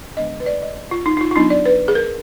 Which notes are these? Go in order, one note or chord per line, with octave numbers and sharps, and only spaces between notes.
D3 G#3 B3 D4 D#5
B4
D5
D#5
F4
D#4
D#4
F4
F4
F#3 B3 D4 D#4
D5
B4
G#4
A#4